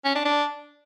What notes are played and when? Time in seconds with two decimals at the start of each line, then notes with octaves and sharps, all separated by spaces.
0.05 C#4
0.15 D4
0.25 D4